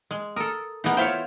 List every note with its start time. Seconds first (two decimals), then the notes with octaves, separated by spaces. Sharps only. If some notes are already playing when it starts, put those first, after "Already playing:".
0.11 G#3
0.36 A4 A#4 D#6
0.84 E3 B3 D#4 G#4 A#4
0.97 E4 F4 C5 C#5 F5 G5